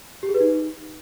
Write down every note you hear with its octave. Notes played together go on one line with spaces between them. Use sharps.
G4
G#4
B4
D#4